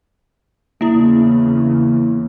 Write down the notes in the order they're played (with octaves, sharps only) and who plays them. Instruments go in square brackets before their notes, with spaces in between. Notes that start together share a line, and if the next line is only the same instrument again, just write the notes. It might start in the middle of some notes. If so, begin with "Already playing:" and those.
[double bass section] E2 C#3 [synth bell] A#3 E4